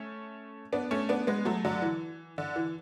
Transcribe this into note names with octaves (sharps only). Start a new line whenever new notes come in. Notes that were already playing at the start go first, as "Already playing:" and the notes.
Already playing: A3 C#4
B3 D4
A3 C#4
B3 D4
G#3 B3
F#3 A3
D3 F#3
E3
D3
E3